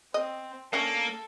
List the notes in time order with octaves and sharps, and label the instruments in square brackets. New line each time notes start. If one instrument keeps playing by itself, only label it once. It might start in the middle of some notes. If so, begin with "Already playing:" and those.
[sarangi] C4 [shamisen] D#5
[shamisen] D3 C#4 C#5 [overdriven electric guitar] A#3 [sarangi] A4